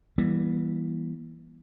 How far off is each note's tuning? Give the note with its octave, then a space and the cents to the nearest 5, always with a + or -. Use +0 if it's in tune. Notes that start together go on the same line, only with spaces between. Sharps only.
E3 +0 G3 +0 B3 -45